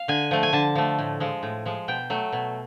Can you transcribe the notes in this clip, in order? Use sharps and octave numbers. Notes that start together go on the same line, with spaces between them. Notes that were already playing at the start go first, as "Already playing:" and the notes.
Already playing: F5
D3 G#5
F3 A3
G#5
D3 A5
F3 A3
A2
F3 G#3
A2
F3 G#3
B2 G5
F#3 A3
B2